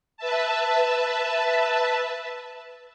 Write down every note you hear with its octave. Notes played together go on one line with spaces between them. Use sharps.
B4 E5 A5